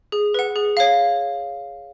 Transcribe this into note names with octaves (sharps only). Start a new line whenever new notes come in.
G#4
B4 F#5
G#4
C#5 F5